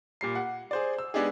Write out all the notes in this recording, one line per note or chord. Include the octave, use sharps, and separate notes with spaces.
A#2 G3 C7
F#5
G#4 C5 D5
E6
G#3 B3 D4 D#4 G4 G#4